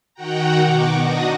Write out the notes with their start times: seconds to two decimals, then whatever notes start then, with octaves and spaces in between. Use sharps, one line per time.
0.14 D#3 F#4 F#5 G5 A#5
0.61 B2 C#6 D6
1.00 D4 D#4 F#4 D#6 A#6